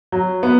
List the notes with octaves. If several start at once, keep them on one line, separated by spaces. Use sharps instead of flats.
F#3
B3